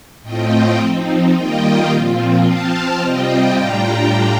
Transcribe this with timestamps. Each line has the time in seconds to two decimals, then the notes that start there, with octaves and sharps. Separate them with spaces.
0.22 A2 A3 C4 F4 D#5 G5
0.77 F3 C4 D#4
1.33 D#3 G3 A#3 F4 D#5 G5
1.89 A#2 F3 C4 F4
2.45 F3 C4 F4 F5 A5
2.99 C3 G3 C4 F4 D#5 G5
3.55 A2 G3 D4 F4 G5 A#5